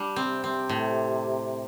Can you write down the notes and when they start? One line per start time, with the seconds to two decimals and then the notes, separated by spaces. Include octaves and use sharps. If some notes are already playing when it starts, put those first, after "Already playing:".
Already playing: G3 D4
0.16 C3 C4
0.44 C4
0.69 A2